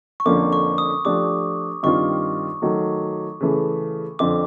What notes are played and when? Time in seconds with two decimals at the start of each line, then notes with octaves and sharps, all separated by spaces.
0.20 C#6
0.26 F2 D3 F3 A#3 C#4 D6
0.53 C#6
0.78 D#6
1.05 F3 A3 D4 G4 D6
1.83 G2 D#3 G3 C4 F4 C#6
2.62 D#3 F#3 A3
3.40 C#3 E3 A3
4.19 F2 D3 F3 D6